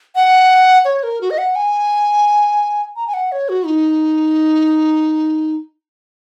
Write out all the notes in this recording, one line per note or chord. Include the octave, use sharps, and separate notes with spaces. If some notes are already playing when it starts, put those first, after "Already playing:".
F#5
C#5
A#4
F#4
D#5
F#5
G#5
A#5
G#5
F#5
C#5
F#4
D#4